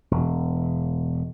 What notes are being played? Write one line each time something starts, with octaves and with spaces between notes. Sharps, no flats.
E1